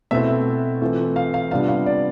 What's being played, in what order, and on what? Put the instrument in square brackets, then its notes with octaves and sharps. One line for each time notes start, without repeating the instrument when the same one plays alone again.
[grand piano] B2 A3 C4 E4 E5
E3 A3 C4 F4
F5
F5
C3 G3 B3 D4 F4 F5
F5
D5